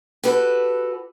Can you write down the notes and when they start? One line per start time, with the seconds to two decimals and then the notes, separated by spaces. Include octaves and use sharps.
0.24 F#4 G4 A4 B4